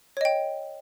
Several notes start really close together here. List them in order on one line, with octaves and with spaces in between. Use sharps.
C#5 D#5 G5